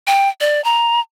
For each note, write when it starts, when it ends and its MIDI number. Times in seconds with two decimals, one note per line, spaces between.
0.07 0.29 79
0.41 0.63 74
0.64 1.00 82